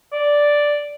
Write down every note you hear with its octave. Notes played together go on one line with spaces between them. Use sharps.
D5